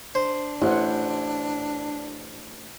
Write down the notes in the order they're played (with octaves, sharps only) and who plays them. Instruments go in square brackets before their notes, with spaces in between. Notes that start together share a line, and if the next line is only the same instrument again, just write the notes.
[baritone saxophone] D4 [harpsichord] C5
[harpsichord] A1 [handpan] E4 C5 F#5